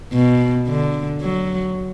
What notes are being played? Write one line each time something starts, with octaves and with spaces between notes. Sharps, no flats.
B2
D3
F#3